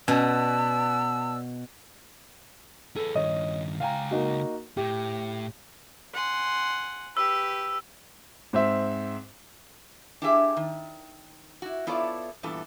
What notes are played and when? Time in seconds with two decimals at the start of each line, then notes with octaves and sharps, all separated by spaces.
0.08 B2 C#4 B4 D5 A5 E6
2.96 G#4 A4 B4
3.15 G2 D#3 C#5 D#5
3.80 C#2 F5 G5 G#5 A#5
4.11 A#3 D#4 F#4
4.77 A2 G4
6.13 F#5 G#5 C6
7.17 G4 B4 E6
8.53 G#2 C4 C5 E5
10.22 D4 E4 G4 G#4 E5
10.57 D#3
11.62 E4 F#4
11.87 B3 E4 F4 A4 C#5 D5
12.43 G2 A#2 E3 B3 E4 A4